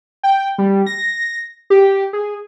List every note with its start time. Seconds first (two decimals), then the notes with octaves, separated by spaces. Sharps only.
0.23 G5
0.58 G3
0.87 A#6
1.70 G4
2.13 G#4